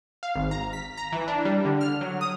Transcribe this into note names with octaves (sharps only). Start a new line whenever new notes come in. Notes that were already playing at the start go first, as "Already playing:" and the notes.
F5
G#1
A#5
B6
A#5
E3
D4
G3
D3
F6
F#3
D#6